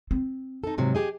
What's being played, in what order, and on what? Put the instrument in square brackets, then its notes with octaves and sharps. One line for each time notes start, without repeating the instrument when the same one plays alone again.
[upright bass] C4
[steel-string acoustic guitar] D#4 A4
G#2 C3 F#3
G4 G#4 D#5